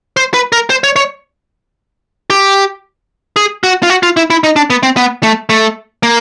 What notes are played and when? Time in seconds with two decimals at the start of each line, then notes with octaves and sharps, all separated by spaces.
0.17 C5
0.34 B4
0.52 A#4
0.70 C5
0.84 C#5
0.96 C#5
2.30 G4
3.36 G#4
3.64 F#4
3.83 F4
3.90 F#4
4.03 F4
4.17 E4
4.30 E4
4.44 D#4
4.56 D4
4.70 B3
4.83 C4
4.97 B3
5.23 A3
5.49 A3
6.03 A#3